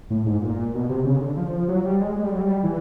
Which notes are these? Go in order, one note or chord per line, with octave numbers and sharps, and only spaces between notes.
A2
G#2
A#2
B2
C3
C#3
D3
F3
F3
F#3
G3
G#3
G#3
G3
F#3
G3
E3